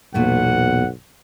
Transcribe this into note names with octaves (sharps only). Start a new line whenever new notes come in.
B1 E2 A#2 A3 F#5